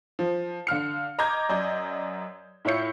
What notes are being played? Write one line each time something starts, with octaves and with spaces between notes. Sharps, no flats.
F3
D3 F5 F6 C#7
D#5 A#5 D6 D#6 G6 G#6
F#2 D5 D#5 G6
A2 E4 F4 C#5 G6 C#7